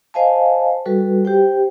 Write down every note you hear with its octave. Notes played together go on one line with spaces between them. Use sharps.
C5 D#5 F5 G#5 A5
G3 F#4 A4 B4
G4 C5 G5